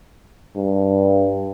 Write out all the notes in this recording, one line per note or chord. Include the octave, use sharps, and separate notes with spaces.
G2